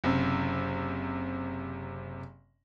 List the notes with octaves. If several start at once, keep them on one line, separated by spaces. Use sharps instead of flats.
F#1 C3